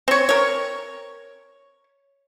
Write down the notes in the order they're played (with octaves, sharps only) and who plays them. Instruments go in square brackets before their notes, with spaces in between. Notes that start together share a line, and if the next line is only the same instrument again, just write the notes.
[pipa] C4 C#5
A#4 C#5